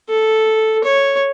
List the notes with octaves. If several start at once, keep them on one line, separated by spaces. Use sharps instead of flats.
A4
C#5